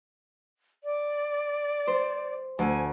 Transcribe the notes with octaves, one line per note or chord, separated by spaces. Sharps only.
D5
C5
D2 G#5